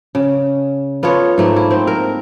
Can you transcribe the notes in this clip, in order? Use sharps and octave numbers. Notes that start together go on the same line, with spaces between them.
C#3
B3 F4 A4 C#5
G#2 A3 A#3
E4
C4
A#4